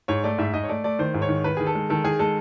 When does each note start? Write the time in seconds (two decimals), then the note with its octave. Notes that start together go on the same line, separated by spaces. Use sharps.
0.08 G#2 C#5
0.24 A3 D5
0.38 G#2 E5
0.53 G#2 D#5
0.64 C#5
0.69 A3 D5
0.84 A3 D5
0.99 D#3 C5
1.14 G#2
1.22 C#5
1.29 D#3
1.44 D#3 B4
1.57 D#3 G#4
1.67 A4
1.75 G#3
1.90 D#3 A4
2.04 D#3 G#4
2.19 G#3 A4